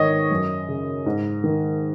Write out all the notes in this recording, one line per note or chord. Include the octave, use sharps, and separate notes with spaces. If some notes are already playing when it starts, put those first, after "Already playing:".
Already playing: G#2 D#3 C#5 D#5
F#2
C#3
G#2
D#3